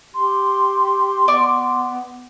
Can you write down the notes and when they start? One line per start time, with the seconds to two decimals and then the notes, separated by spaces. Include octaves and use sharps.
0.14 G4 C6
1.28 B3 D5 C#6 D6